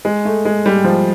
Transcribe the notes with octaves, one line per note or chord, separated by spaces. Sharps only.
G#3
A3
G#3
G3
F3